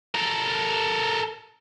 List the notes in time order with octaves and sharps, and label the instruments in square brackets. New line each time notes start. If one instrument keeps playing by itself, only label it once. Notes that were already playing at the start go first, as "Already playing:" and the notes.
[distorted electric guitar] A4 A#4